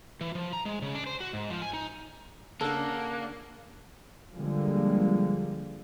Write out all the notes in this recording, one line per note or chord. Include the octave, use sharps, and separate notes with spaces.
E3
F3
A#5
G#3
C#3
D4
C5
F#4
G#2
F3
G#5
D#4
C#3 A#3 D4 A4 F#5
D3 F3 G3 G#3 A#3